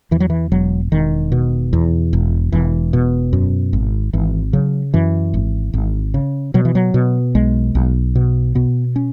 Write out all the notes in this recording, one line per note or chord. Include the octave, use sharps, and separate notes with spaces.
E2 E3
F#3
E3
E1 F#3
E1 D#3
B2
E2
E1
E1 E3
B2
F#2
G#1
G#1 E3
C#3 F#3
F#2 E3
G#1
G#1
C#3
B2 F#3
E3
F#3
B2
B1 G#3
B1
B2
B2 B3
C#4